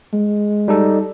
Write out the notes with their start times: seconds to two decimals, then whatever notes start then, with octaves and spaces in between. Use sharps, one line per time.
0.13 G#3
0.68 G3 D#4 A4